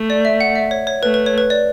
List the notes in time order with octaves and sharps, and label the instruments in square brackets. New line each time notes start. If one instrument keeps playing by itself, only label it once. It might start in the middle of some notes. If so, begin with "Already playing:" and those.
Already playing: [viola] A3
[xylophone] D5
E5
F#5
E5
C#5
C#5
[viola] A3 [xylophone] B4
[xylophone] B4
C#5
B4
D5